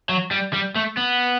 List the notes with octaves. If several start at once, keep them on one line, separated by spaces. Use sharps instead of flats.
F#3
G3
G3
A3
B3